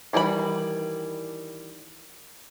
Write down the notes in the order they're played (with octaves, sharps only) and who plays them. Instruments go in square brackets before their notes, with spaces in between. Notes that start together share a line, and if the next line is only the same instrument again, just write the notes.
[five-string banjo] D#3 E3 G3 F#4 B5